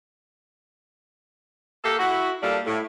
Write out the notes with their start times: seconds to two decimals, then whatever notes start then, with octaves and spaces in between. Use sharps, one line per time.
1.85 A#3 G4 A4
1.99 E4 F#4
2.43 A#2 G3 D4 A4 F5
2.66 A2